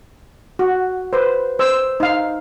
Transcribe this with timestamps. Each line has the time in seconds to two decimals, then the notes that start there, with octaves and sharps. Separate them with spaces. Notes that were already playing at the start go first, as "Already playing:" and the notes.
0.59 F#4
1.13 B4 C5
1.59 C5 E6
2.00 D#4 F5